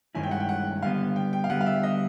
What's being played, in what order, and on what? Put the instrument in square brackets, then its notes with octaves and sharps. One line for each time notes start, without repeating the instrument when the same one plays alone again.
[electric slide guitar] G2 D#3 G#3 C#4 E4 [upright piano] G#5
[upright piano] G5
F#5
G5
F#5
[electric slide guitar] D3 G3 B3 [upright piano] F5
[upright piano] G5
G5
F5
[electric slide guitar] D3 G3 B3 [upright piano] F#5
[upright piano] F5
E5
D#5